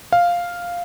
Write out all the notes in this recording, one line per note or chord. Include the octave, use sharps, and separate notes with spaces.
F5